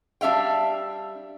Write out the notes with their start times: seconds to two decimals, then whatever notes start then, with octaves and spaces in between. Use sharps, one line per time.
0.21 G3 D4 E5 F5 G5